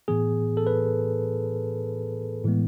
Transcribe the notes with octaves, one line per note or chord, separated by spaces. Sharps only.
A2 E3 B3 G#4
A4
B4
A2 E3 G#3 B3